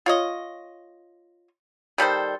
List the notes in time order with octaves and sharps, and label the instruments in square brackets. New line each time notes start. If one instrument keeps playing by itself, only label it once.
[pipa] F4 C#5 D#5
D#3 G3 A4 C5